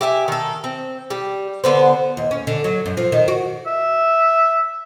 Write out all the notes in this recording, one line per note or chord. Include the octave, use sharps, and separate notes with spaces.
G4 E5 G#5
D#3 A4
C4
G3
D3 B3 C5
D#2
C#4
D3
F#3
F#2
F3
D#3
F#4
E5